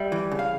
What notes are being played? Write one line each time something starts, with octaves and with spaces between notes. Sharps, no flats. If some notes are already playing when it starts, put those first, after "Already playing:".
Already playing: G3 E5
E3
C#3
F5